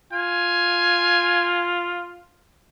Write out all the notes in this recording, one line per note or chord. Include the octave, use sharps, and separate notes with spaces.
F4 G#5